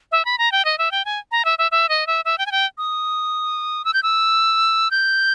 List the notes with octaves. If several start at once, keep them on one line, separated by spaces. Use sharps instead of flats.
E5
B5
A#5
G5
D#5
E5
G5
G#5
A#5
E5
E5
E5
D#5
E5
E5
G5
G#5
G5
D#6
E6
G6
E6
G6